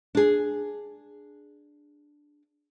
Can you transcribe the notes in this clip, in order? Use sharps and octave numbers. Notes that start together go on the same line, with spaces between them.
D4 G#4